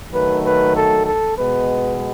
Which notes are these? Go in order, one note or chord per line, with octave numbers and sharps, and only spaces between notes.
D#3 F#3 A3 B4
B4
A4
A4
B2 G#3 B3 B4